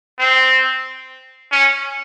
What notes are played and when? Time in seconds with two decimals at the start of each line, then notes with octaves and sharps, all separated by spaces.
0.19 C4
1.52 C#4